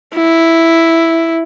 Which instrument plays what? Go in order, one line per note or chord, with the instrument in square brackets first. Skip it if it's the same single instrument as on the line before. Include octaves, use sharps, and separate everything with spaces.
[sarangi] E4